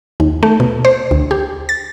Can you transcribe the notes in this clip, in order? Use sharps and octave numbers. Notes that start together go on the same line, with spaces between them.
D#2
A3
B2
C5
D2
G4
A6